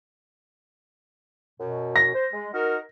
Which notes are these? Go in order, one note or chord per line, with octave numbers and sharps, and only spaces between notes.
F#2 B2
A#6
C5
G#3
D#4 F#4 A#4